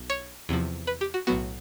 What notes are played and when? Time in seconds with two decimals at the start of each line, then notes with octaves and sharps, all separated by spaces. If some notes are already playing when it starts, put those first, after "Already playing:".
Already playing: B1
0.10 C#5
0.49 E2 C3 F3
0.87 B4
1.01 G4
1.14 F#4
1.27 B1 A2 F#3 B3 F#4